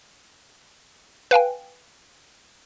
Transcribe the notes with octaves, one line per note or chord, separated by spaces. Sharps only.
B4 F5 G5 G#5